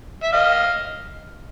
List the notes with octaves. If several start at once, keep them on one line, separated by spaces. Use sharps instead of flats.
E5
D#5 F5